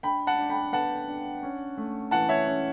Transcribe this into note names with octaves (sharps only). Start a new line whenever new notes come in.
D4 G5 B5
F#5 A5
D4
G5 B5
B3 F#5 A5
D4
C#4
A3
E3 F#5 A5
C#5 E5
C#4